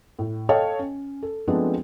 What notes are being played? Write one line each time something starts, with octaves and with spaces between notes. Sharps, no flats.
A2
A4 C#5 D#5 F5 G5 A5
C#4
A4
F3 G#3 A3 B3 C4 D4